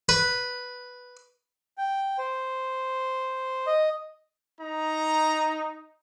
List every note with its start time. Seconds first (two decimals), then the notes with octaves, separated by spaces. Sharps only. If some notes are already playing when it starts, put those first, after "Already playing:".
0.09 B4
1.78 G5
2.18 C5
3.67 D#5
4.61 D#4 A#5